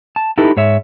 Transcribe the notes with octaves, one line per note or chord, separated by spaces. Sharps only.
A5
D#4 E4 G4 A4 B4
G#2 C#5 E5